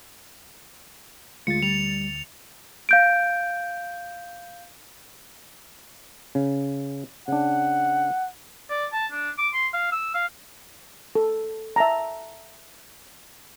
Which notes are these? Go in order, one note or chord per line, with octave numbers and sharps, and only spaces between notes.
D2 G#3 F4 A6 C#7
G3 F7
F5 G6 D7
C#3
C#3 D4 F#5
D5
A5
D4
D6
C6
F5
E6
F5
A4
E5 A5 A#5